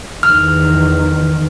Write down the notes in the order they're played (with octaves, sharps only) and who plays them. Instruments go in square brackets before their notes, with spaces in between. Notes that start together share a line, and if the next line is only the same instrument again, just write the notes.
[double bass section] E2 D#3 [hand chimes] F6